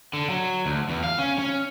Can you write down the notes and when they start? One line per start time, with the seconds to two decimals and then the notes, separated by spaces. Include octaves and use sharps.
0.13 D3
0.30 F#3
0.65 D2
0.89 E2
1.04 F5
1.18 C#4
1.39 C#4